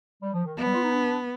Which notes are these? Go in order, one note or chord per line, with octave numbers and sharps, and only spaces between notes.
G3
F3
D#3
F3 B3
G3
F4
D#4
D4